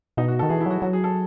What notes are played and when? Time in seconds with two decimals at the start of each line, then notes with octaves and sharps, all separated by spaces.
0.17 B2 D#4
0.28 F#4
0.39 A4
0.42 D#3
0.49 E3 G#4
0.61 E4
0.66 F#3 F#4
0.82 F#3 F#4
0.93 G#4
1.04 A4